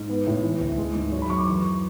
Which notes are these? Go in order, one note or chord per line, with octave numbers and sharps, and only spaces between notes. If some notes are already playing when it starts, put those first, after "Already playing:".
Already playing: G#2
B3
A2
E3
D2
G#3
G#2
F#3 C#5
B5
F#2 C#6
D6
E3 C#6